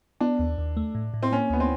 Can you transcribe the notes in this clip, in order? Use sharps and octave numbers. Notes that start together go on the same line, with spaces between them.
B3 D4
D#2
D#2
A3
A2
A2
C4
A#3 C#4
D2 B3
C4